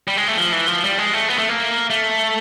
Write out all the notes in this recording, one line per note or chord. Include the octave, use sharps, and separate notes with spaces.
G3
G#3
A3
F3
E3
F3
G3
G#3
A3
B3
A3
A#3
A3